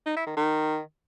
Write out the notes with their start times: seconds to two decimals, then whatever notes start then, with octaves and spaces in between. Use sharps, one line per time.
0.06 D#4
0.16 E4
0.27 D#3
0.37 D#3